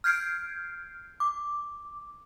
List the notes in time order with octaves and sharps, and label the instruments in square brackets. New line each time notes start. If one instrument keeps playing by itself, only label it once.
[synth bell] F6 G6 G#6 C7 D7
D6